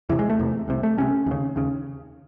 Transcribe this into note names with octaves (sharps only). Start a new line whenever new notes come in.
E2 C3 E3
G#3
A3
E2 C3
C2 C3
A3
C2 C3 C#4
D#2 C#3
D#2 C#3